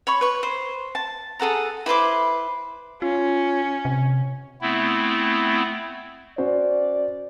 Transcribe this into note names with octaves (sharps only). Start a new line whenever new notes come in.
C#5 B5 C#6
B4 C#6
C5
A5
G#4 A4 F#5 A#5
E4 B4 C5 D6
C#4 F4
C3
A3 B3 C4 E4
C#4 F#4 C5 D5